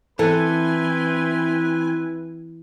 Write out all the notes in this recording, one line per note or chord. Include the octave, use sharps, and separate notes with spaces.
E3 C4 E4 A4 B4 G#5